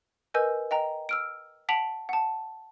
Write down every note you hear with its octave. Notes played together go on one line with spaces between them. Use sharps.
A#4 B4 D#5 G#5 E6 G6
D#5 G5 A#5
E6 F6 D7
F#5 A5 B6 D7 F7 F#7
F#5 A5